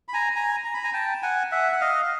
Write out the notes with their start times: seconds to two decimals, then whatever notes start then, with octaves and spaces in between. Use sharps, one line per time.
0.08 B5
0.13 G#5 A#5
0.36 G#5 A#5
0.64 A#5
0.74 B5
0.83 G#5 A#5
0.93 G5 A5
1.23 F#5 G#5
1.52 E5 F#5
1.72 F#5
1.81 D#5 F5